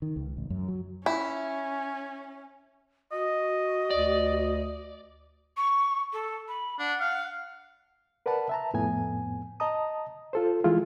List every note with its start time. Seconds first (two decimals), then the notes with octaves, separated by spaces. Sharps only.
0.02 D#3
0.16 C#2
0.37 A1
0.50 F#2
0.68 F#3
1.06 C#4 E4
3.12 F#4 D#5
3.90 D2 D5
5.57 C#6
6.13 A4
6.48 B5
6.79 D4 F#5
7.00 F5
8.26 A#4 B4 D5 F#5 A5 B5
8.49 E5 A5 A#5
8.74 F2 A2 B3 G#5
9.60 D#5 A5 A#5 D#6
10.33 F4 A4 C5
10.64 E3 G#3 E4 F4 G#4